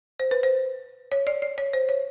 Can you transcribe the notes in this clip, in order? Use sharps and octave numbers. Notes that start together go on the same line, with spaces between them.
C5
B4
C5
C#5
D5
D5
C#5
C5
C#5